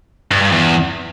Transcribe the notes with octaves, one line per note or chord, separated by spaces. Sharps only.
G2
G2
E2